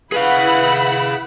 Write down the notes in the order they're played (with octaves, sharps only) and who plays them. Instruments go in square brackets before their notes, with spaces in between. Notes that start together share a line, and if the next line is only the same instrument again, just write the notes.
[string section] E4 F#5 B5 [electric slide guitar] G#4 F5 [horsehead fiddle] B4